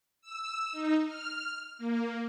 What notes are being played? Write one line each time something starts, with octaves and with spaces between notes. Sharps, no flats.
E6
D#4
F6
A#3